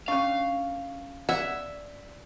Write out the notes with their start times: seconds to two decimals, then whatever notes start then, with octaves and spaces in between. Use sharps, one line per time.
0.08 C#4 D4 C#5 F5 C#6
1.29 D5 E5 F#5